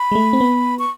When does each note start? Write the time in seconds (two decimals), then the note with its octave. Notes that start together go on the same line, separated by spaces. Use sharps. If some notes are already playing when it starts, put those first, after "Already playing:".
Already playing: B5
0.12 G#3
0.15 A3
0.33 C4
0.41 B3
0.79 C#6